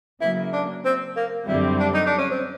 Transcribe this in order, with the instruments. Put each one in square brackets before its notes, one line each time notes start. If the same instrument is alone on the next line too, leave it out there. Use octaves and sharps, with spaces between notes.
[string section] C#3 F#3 A#3 [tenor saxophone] E4
[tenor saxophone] D4
C4
A#3
[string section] F#2 D3 G3 C4 [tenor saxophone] E4
[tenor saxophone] D4
D#4
D4
C#4
C4